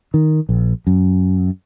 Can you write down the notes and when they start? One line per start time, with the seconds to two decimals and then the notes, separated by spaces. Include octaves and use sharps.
0.14 D#3
0.49 A#1
0.87 F#2